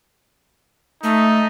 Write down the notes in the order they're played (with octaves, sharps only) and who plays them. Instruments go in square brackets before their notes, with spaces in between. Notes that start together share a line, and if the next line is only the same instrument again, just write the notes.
[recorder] A3 [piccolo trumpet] D#4